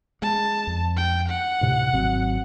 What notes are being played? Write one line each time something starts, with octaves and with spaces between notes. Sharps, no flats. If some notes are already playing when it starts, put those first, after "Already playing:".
G#3 A5
F2
G5
F#5
D2 A2 C3
G#1 F#3 C4